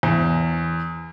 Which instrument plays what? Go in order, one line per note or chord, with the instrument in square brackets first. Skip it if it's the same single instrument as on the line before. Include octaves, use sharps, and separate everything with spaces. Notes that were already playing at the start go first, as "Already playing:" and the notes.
[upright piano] E2